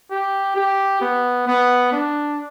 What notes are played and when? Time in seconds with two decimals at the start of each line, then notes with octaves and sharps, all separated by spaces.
0.11 G4
0.56 G4
1.01 B3
1.47 B3
1.92 D4